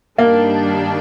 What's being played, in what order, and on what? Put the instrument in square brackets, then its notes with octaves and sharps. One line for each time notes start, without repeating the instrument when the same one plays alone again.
[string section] G2 D#3 G3 D4 [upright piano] A#3